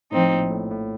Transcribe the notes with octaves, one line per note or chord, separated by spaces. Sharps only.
A2 F3 C4 D#4
A#1 A#2
A2
A2